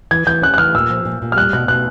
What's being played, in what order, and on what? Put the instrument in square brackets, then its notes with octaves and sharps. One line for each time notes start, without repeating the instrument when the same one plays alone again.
[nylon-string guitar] E3 [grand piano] G#6
[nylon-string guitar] E3 [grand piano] G6
[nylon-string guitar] C#4 [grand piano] F#6
[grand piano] F#6
[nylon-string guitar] E3 [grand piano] F6
[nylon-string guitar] A#2 [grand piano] E6
[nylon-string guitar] F3
A#2
A#2
[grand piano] F6
[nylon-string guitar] G3 [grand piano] F#6
[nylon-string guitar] B2 [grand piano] F#6
[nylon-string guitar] B2 [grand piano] F#6